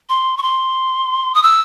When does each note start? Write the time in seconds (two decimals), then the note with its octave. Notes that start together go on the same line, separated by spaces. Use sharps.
0.09 C6
0.37 C#6
0.42 C6
1.35 D#6
1.43 E6